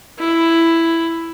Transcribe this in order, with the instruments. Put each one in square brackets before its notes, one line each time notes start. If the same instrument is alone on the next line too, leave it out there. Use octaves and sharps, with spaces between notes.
[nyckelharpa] E4